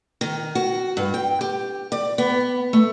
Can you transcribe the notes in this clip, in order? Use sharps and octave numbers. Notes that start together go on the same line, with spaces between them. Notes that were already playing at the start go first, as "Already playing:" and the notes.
D#3
F#4
G2
G5
G4
D5
B3
A3